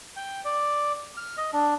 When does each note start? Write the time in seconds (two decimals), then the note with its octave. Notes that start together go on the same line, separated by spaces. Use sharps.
0.16 G5
0.45 D5
1.17 F6
1.37 D#5
1.53 D4